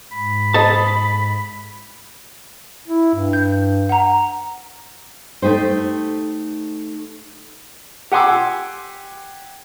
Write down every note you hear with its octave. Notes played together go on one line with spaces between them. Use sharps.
G#2 B5
A4 C5 D#5 A5
E4
G2
G6
F#5 A#5
A3 D#4 G4 C5
G4 F#5 G#5 C6 D6 E6